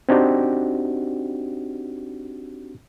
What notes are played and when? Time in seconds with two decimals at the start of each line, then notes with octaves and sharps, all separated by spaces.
0.09 C4 D4 D#4 F#4 G4